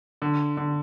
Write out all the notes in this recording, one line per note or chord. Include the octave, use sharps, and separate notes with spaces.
D3
D3